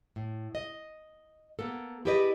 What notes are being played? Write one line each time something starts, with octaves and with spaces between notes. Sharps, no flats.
A2
D#5
A#3 B3 A4
E4 G4 G#4 B4 D5 D#5